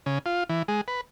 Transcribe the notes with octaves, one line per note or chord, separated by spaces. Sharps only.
C#3
F4
E3
G#3
B4